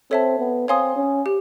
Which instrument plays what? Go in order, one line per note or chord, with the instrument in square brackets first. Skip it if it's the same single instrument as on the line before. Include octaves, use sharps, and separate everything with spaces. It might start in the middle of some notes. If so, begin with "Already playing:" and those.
[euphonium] C4 [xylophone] A4 C#5 E5 A5
[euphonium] B3
[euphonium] C4 [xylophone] C#5 F5 G#5 C6 D#6
[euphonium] C#4
[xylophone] G4